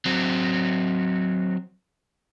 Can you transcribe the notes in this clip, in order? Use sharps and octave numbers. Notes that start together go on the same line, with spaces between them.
F#3 C4